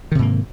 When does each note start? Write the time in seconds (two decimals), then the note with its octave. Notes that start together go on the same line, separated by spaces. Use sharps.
0.12 D#3
0.15 C3
0.19 G#2
0.22 A#3